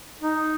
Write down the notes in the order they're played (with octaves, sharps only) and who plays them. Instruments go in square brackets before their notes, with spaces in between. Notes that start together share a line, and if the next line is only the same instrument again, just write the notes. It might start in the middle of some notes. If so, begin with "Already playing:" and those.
[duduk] D#4